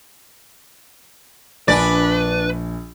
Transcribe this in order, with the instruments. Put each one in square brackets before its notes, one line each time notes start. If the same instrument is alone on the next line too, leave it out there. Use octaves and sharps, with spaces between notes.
[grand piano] A#1 G#5 [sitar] D4 D5 [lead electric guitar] B4